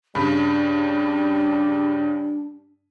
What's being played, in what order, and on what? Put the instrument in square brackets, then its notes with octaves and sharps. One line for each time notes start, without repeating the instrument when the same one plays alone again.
[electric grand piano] G2 C#3 [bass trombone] G3 [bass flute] D4 [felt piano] B5